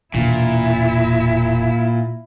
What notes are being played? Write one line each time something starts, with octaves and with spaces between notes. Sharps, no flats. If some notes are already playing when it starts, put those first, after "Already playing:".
E1 A#2 E4